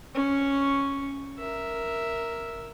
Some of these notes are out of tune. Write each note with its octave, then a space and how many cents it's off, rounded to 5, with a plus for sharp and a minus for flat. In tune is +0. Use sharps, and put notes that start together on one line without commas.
C#4 +0 C#6 +0
A#4 +0 E5 +0